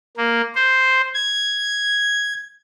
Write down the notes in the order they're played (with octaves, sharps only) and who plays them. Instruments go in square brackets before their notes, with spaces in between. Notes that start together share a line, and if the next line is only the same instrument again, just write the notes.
[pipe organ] A#3
C5
G#6